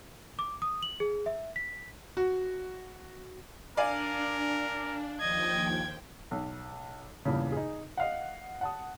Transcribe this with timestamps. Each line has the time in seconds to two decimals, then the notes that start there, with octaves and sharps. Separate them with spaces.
0.39 D6
0.62 D#6
0.83 F#7
1.00 G#4
1.26 E5
1.56 B6
2.17 F#4
3.77 D4 A#4 D5 F5 G#5
5.20 D#2 F3 D#5 G5 G#6
6.31 B1
7.25 E2 G2 A#2 C#3
7.52 D#4 G#4
7.97 D#5 F5 F#5
8.61 F#5 A5 D#6